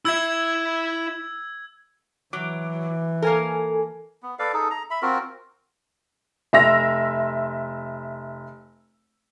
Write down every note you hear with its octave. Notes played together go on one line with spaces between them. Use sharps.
E4 E5 E6 G#6
E3 F#3 D6
A#3 A4 A#4 G#5
B3
A4 B4 D5 F5
D#4 G#4 A4
A#5
E5 B5
C4 F4 F#4 A#4
F1 E5 C6 E6 A#6 F7